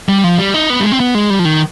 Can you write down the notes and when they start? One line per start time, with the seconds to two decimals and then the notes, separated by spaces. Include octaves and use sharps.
0.09 G3
0.24 F3
0.39 G3
0.54 D#4
0.70 B3
0.80 G3
0.84 G#3
0.92 C4
1.00 B3
1.15 G#3
1.30 G3
1.39 F3
1.45 D#3